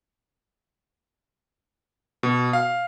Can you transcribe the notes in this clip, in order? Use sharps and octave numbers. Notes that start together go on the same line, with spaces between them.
B2
F5